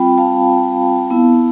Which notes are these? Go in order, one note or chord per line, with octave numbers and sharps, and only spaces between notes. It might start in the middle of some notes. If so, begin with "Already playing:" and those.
Already playing: G3 C4 F4 G5 B5
F5 A5
B3 E4